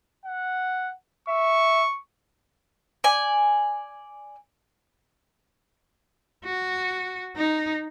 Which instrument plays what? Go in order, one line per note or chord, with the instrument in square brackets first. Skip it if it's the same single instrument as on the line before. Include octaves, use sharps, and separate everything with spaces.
[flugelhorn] F#5
[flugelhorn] E5 [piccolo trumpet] C#6
[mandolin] D5 G#5
[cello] F#4
D#4